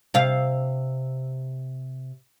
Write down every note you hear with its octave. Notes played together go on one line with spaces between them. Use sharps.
C3 F5